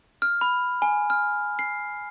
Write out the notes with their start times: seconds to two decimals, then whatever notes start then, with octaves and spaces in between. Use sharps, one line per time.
0.22 F6
0.41 B5
0.82 G#5
1.10 F6
1.59 C7